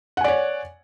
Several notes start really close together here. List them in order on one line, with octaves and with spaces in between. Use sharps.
F#5 G#5 D5 C#5